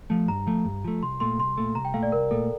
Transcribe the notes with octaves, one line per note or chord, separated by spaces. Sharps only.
F3 A3
G2 A#5
F3 A3
G2
F3 A3
C2 C6
A#2 A3 C6
C2 C6
A#2 A3
C2 A#5
G5
A#2 A3 F5
D5
C2 A#4
A#2 A3 A4